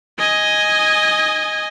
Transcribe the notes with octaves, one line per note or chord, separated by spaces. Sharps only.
D#5 G#5